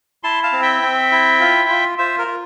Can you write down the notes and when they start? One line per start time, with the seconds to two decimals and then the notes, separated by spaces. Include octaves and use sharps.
0.23 E4 A5 C6
0.43 F5 A5
0.52 C4
0.62 E5 G5
0.82 C4
1.12 E4
1.40 F4
1.69 F4
1.98 F4 C5 E5
2.18 A#4
2.27 F4